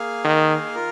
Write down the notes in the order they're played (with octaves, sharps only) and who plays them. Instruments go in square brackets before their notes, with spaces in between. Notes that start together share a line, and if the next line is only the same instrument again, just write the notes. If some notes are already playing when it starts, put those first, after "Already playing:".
Already playing: [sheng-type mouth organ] A#3 G#4 F5
[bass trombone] D#3
[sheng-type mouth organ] F4 A#4